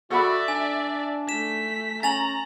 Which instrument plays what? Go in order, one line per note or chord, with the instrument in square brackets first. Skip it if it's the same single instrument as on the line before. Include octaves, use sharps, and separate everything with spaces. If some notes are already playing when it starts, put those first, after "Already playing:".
[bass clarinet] F#4 [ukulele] A4 F#5 B5 [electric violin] D5 E5
[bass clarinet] D4 [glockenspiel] G#5
[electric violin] A3 B6 [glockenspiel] E7
[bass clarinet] C#4 [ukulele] G#5 [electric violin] A#5 [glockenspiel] A6 F7 F#7